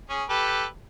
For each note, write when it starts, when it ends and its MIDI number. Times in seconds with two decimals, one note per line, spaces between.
0.10 0.24 61
0.10 0.24 68
0.29 0.65 67
0.29 0.65 69
0.29 0.65 71